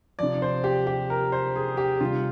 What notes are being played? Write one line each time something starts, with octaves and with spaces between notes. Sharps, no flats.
C3 F3 D5
C5
G4
G4
A#4
C5
G#4
G4
C3 G3 F4